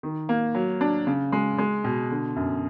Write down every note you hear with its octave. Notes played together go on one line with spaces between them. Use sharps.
D#3
A#3
F#3
D4
C#3
G#3
G#3
B2
D3
F#2